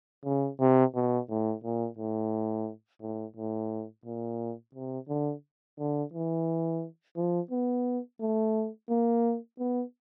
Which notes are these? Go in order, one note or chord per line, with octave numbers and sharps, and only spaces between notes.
C#3
C3
B2
A2
A#2
A2
A2
A2
A#2
C3
D3
D3
E3
F3
B3
A3
A#3
B3